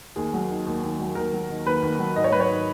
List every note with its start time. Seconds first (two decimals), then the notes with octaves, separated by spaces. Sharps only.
0.16 D#2 G#4
0.33 F#3
0.50 D#3
0.67 D#2
0.83 D#2
1.00 F#3
1.15 D#2 A#4
1.33 F#3
1.50 D#3
1.66 D#2 B4
1.82 D#2
1.99 F#3
2.16 G#2 D#5
2.24 C#5
2.32 F#3 B4
2.40 C#5
2.50 D#3